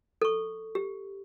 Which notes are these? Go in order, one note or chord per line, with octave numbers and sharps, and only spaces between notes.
A4 C#6
G4